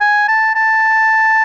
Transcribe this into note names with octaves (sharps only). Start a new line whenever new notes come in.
G#5
A5
A5